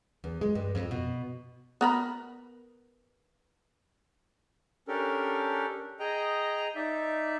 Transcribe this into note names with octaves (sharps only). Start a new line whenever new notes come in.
E2
G#3
G2
F2
B2
B3 A#4 B5
C#4 D4 G4 A4 A#4
G#4 D#5 G5 A#5
D#4 D5 E5